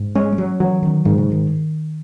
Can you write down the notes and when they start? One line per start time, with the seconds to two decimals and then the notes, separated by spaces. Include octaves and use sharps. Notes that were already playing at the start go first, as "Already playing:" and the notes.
Already playing: G#2
0.15 G#3 C#4
0.33 G#3
0.38 F#3
0.60 E3 F#3
0.83 D#3
1.05 G#2 D#3
1.18 C#3
1.32 D#3